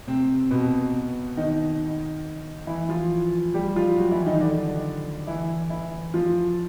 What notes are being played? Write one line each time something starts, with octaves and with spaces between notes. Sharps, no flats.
C3 C4
B2 B3
D#3 D#4
E3 E4
F3 F4
G3 G4
F3 F4
F#3 F#4
E3 E4
D#3 D#4
D3 D4
E3 E4
E3 E4
F3 F4